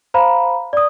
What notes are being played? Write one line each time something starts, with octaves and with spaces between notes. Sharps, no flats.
C5 F5 A#5 B5
D5 D#6